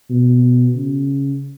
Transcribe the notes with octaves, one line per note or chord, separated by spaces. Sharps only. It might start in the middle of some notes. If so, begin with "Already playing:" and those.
B2
C#3